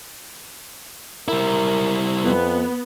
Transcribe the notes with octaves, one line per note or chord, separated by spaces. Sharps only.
G3 E4 A#4
F2 B3